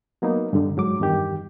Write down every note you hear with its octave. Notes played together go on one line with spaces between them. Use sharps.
F#3 A#3 B3 D#4
G2 D3
G#2 F#3 D6
E2 G2 D#3 G4